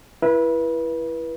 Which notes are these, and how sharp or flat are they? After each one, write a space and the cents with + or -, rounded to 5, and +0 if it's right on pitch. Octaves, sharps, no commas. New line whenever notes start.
E4 +20 B4 -30 E5 +0